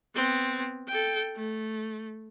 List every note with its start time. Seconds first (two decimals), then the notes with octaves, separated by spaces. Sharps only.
0.15 B3 C4
0.88 A4 G5
1.36 A3